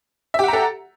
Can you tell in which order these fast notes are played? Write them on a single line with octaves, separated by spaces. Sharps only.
E5 G4 F#5 A#5 A4